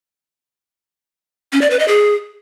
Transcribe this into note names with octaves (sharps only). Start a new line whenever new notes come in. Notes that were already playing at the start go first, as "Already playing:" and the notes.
C#4
D5
B4
D#5
G#4